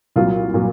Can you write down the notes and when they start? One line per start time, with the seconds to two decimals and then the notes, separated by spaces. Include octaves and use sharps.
0.16 C2 A#2 F#3 F4
0.54 A#2 F#3